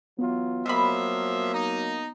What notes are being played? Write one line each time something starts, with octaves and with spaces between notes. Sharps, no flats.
E3 F#3 B3 F4
F3 F#3 A#3 D#5 E5 B5
D#4